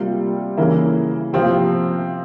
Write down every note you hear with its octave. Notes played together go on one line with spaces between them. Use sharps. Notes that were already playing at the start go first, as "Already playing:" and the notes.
Already playing: C3 G3 A#3 F4
C#3 E3 A#3 E4
C3 F3 C4 F4